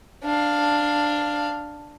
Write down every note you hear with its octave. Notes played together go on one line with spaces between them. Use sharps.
D4 F5